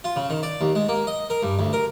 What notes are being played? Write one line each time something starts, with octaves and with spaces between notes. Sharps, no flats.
F4
C#3
D#3
D5
D#2
G#3
A#3
D#5
A#4
G2
D2
A#4